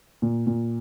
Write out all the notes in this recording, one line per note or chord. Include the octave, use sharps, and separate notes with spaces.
A#2
A#2